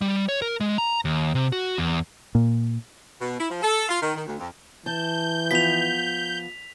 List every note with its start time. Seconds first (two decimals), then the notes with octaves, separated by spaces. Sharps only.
0.01 G3
0.29 C#5
0.42 A#4
0.60 G#3
0.78 A#5
1.05 D#2
1.35 C3
1.52 F#4
1.78 E2
2.35 A#2
3.21 B2
3.39 E4
3.50 F3
3.62 A4
3.89 F4
4.01 D#3
4.15 D#3
4.27 D2
4.38 F2
4.86 E3 A5 G6
5.51 F3 B3 B6 F7